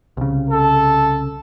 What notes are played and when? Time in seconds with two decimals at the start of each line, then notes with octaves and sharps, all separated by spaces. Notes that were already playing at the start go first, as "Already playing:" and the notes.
0.17 C2 C#3
0.49 A4